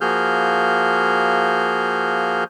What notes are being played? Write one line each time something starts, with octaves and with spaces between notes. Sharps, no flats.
F3 A#3 F#4 G#4 F6 G6